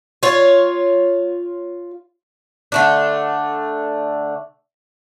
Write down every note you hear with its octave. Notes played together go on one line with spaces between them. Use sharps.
F4 C#5
D3 A3 D4